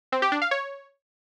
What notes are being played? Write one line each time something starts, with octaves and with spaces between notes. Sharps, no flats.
C4
G4
D4
F5
C#5